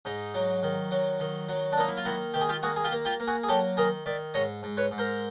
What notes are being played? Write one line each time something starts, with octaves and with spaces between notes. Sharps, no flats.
G#2 D#4
F#3
D#3
F#3
D#3
F#3
D4
A#3 D#4
E4
F4
D#3 E4 F#4
D#3 G4
G#4
F4 G4
A#3 F#4 G#4
G#4
F4 G4
A#3
F4 G4
A#3
F#4 G#4
G#4
F#3 G4 A4
D#3 G#4 A#4
D#3 D5 E5
G#2 C#5 D#5
G#2
B4 C#5
G#2
A#4 C5